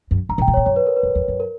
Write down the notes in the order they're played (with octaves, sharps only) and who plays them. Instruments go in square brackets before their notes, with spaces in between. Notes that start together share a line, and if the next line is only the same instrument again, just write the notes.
[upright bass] F#2
[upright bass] G2 [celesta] A#5
[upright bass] A#2
[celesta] G5
[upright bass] B2
[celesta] C#5
[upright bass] A#2
[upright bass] F#2 [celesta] C#5
[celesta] B4
A#4
B4
[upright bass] F#2
E2
F#2
[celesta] A#4